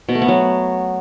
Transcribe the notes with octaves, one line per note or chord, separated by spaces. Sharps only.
B2
A3
B3
F#3